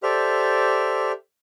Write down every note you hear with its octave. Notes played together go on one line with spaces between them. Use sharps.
G4 A4 C5 D5 E5 F6